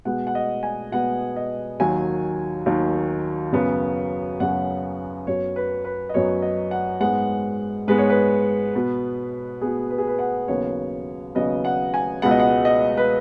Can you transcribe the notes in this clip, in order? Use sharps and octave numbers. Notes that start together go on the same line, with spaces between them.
B2 G#3 B3 F#5
F#5
D#5
G#5
B2 G#3 B3 F#5
D#5
D#2 D#3 F#3 G#5
D#2 D#3 F#3
F#2 C#3 F#3 B3
F#2 C#3 F#3 B3 F#5
F#2 F#3 B3 C#5
B4
B4
D#5
F#2 F#3 B3 C#5
D#5
F#5
G#2 G#3 B3 F#5
G#2 G#3 B3 B4
C#5
B4
B2 B3
B2 B3 G#4
B4
G#4
B4
F#5
D#2 C#3 F#3 B3 C#5
D#2 C#3 F#3 B3 D#5
F#5
G#5
C#2 B2 G#3 B3 F#5
D#5
F#5
D#5
B4